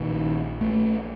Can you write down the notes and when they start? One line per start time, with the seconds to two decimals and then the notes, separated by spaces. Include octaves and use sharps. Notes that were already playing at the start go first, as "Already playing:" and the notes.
Already playing: A#1 A#2 D#3
0.61 A3